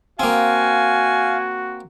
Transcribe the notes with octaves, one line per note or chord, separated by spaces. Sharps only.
A#3 C4 F#4 F5 G#5